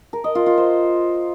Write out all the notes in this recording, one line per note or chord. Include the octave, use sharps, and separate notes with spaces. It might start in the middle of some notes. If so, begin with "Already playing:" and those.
A#4
D#5
F4
F4
C5